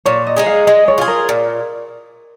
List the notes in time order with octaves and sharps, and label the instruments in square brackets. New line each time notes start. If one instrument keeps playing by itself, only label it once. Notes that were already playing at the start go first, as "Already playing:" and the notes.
[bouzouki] A#2 [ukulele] C#5
[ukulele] D#5
[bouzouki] G#3 D#4 G#4
[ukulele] F5
[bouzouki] G#3 [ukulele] D#5
[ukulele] C#5
[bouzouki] F4 G#4
[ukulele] A#4
[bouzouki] A#2